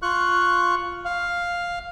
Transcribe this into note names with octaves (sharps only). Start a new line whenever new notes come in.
F4 C#6 F#6
F5